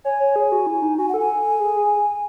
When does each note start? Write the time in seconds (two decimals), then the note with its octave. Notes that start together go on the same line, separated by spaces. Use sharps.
0.05 C#5 G#5
0.20 C#5
0.36 G#4
0.52 F#4
0.67 E4
0.82 D#4
0.98 F#4 G#5
1.09 F#5
1.14 A4
1.20 G#5
1.60 G#4
1.76 G#4